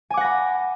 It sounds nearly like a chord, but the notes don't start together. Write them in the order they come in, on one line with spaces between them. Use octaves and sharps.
G#5 D6 F#5 A#6 B5